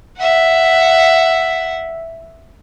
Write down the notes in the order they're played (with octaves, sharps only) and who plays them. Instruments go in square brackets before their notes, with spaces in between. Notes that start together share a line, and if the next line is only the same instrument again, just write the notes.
[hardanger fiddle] E5 F#5